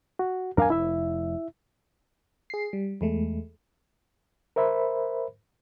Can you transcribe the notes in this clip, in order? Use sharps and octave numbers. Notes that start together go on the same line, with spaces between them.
F#4
E2 G2 D4 A#4 F5 G#5
F1 E4 E5
G#4 C7
G3
E2 G#3 A3
A#4 C5 E5 B5